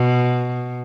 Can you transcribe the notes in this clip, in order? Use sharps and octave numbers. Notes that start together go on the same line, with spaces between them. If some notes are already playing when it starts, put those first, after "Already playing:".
Already playing: B2